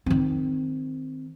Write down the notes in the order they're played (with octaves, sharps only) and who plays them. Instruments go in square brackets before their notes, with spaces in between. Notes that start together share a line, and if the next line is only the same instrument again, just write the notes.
[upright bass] D#3 C4